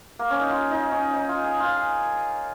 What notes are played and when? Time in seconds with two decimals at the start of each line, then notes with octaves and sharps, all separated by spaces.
0.19 A#3
0.30 C#4
0.40 D#4
0.51 F4
0.71 D#4
0.92 C#4
1.13 D#4
1.29 F4
1.44 G#4
1.60 F4
1.76 G#4